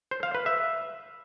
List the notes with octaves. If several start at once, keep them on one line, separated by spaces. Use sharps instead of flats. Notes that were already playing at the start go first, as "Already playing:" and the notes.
C5
F5
B4
E5